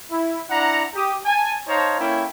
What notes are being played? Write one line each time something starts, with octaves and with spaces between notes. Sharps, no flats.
E4
D4 E4 F#5 A#5
G4 D#6
G#5 A5
D#4 C5 C#5 F5 A5 A#5
A#3 C#4 E4 A4 C#5 G5